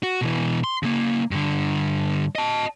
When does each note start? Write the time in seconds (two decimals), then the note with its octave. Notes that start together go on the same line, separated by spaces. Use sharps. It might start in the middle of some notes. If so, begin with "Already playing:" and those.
0.03 F#4
0.21 B2 E3
0.64 C6
0.83 C#3 A#3
1.31 G2 D3
2.35 D#5 A5